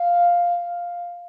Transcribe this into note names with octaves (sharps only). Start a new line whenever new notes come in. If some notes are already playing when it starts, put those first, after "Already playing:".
Already playing: F5